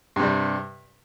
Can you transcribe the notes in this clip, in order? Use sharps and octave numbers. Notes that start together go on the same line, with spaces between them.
G2 C3 G3